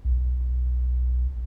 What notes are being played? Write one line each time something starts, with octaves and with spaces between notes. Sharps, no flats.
B1